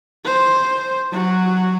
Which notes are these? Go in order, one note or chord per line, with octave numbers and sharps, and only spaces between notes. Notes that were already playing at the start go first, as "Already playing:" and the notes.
C5
F#3 F#4